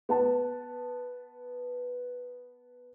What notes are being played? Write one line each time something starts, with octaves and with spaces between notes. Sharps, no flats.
B3 F#5 A5